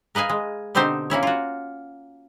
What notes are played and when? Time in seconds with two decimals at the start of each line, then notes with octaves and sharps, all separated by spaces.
0.15 A#4 B4 D#5 F5 G#5
0.29 G#3
0.75 B2 D3 C4 D#4 G4 C5
1.10 A#3 C#4 E4 C#5
1.23 F4 F#4